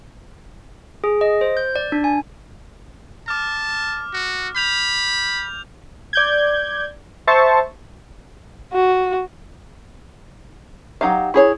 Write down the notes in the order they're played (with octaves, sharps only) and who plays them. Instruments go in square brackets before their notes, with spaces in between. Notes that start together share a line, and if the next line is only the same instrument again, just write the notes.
[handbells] G#4
D#5
C5
G6
D5
D4
G#5
[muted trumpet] A5 [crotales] D6 F6
[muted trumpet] F#4
[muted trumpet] B5 [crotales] G6 F7
[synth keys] D5 G6 G#6
C5 E5 A5 C#6
[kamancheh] F#4
[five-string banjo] F#3 D#4 G4 F5
E4 G#4 C#5